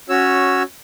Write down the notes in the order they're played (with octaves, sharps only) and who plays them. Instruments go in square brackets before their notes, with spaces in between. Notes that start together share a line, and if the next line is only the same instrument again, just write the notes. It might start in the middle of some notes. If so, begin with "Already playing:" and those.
[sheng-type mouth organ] C#4 F#4 C#5 E6